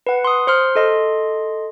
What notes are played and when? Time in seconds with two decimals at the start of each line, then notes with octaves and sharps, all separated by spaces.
0.07 B4 F#5
0.24 C6 D#6
0.47 C5 C6 F6
0.76 A4 D#5 C6